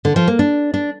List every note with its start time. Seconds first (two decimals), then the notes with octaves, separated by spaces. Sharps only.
0.05 D3
0.16 F3
0.28 A#3
0.39 D4
0.74 D4